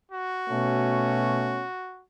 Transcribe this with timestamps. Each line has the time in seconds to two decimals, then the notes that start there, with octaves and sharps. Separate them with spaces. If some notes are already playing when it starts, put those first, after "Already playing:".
0.12 F#4
0.48 B2 A3 C#4